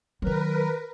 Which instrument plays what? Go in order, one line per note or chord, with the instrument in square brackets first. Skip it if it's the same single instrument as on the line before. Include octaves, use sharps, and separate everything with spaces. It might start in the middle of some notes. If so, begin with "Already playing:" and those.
[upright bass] D#3 F#3 [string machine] A#4 B4